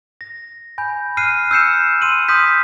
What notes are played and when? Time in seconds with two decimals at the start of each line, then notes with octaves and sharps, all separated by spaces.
0.21 A#6
0.78 G#5 B5 G6
1.17 F6 F#6 C7 D#7
1.51 E6 F6 G6 C7 C#7 E7
2.01 C6 E6 D#7 F#7
2.28 C6 D#6 F6 G6 B6